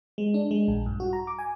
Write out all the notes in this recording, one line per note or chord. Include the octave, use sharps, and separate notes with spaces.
G#3
D4
G#3
A#1
G2
F#4
A#5
D6
G#5